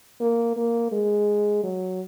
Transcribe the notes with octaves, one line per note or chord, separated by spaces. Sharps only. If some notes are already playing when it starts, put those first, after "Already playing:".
A#3
A#3
G#3
F#3